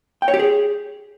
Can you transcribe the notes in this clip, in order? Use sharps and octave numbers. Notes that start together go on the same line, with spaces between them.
G5
C#5
G4
G#4